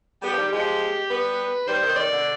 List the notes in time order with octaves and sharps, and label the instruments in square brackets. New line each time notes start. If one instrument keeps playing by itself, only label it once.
[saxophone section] G3 B3 [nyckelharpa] G4
[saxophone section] F3
D#3 G3
[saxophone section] F3 G#3 [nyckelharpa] G4
[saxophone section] G3 B3 [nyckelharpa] B4
[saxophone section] D#3 G3 [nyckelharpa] C5
[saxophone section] C3 D#3
[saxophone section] C3 D#3 [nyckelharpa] D5
[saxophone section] B2 D3